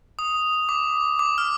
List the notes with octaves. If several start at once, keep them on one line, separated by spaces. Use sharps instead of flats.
D#6
D6
D6
F6